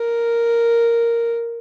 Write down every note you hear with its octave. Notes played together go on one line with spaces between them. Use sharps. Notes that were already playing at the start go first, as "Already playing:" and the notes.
Already playing: A#4